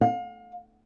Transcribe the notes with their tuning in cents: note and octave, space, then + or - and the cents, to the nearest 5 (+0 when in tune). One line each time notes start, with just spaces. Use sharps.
F5 +35